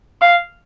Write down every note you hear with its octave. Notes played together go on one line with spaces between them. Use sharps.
F5